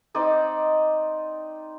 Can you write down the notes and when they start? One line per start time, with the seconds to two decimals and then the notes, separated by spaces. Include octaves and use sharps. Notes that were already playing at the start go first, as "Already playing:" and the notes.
0.15 C4 D#4 D5 D#5